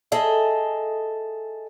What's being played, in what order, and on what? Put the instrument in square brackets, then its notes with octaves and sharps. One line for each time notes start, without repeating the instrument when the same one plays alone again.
[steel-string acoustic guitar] G#4 A4 D#5 E5